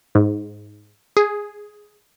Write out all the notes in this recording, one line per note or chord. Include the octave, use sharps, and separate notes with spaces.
G#2
G#4